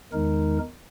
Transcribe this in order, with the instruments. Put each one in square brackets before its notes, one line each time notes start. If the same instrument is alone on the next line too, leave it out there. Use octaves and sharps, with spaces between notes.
[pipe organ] E2 D#3 G#3 D#4 A#4